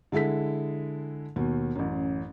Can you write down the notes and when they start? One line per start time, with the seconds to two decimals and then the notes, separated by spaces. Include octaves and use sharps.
0.12 D3 G#3 E4 A4 B6
1.36 D#2 B2
1.75 A1 F#2